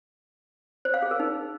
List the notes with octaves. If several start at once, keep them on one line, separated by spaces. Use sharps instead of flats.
C5
F5
G#4
A#4
D#4